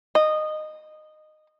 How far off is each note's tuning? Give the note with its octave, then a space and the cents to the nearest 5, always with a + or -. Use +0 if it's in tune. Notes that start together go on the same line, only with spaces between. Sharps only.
D#5 -15